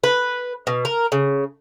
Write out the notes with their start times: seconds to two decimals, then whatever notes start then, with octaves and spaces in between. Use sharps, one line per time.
0.04 B4
0.67 B2
0.85 A#4
1.12 C#3